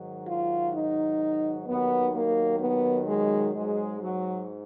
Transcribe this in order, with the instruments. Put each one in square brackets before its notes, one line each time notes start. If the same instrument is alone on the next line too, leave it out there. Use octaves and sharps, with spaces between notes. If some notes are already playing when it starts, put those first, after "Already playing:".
Already playing: [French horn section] G#2 D#3 F#3
F4
D#4
D#2 D#3 F#3 B3
A#3
B3
G#3
G#2 F#3 G#3
F#3